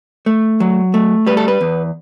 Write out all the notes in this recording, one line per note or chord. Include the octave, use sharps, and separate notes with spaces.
A3
F#3
A3
G3 B4
A4
B4
E2